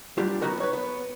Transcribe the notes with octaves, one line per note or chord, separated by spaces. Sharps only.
F#3 G3 D4 F4 G4
F#3 A#3 B3 D#4 F#4 A#4
B4 C#5
B3